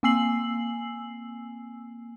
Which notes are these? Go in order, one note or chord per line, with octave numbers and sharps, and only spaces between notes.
A#3 C4 G#5 E6 C7 F#7